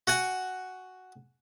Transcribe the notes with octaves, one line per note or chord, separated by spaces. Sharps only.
F#4 F#5 G#5